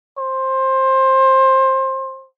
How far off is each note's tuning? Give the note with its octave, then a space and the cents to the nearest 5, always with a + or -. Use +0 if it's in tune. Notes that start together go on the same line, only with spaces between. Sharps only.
C5 +20